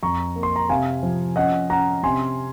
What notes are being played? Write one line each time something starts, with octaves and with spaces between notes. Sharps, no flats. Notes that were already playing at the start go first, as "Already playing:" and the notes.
F2 A#5 C#6
A#3
C6
A#5
C3 F5 G#5
F3
C#4 D#5 F#5
C#4 F#5 A#5
C3 G#5 C6